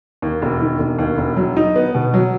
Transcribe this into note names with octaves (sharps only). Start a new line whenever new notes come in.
D#2
E1
D#3
E1
D#2
E1
F#3
D#4
B3
B2
F#3